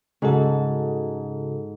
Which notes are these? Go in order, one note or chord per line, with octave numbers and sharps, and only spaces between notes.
G#2 C#3 F#4 A4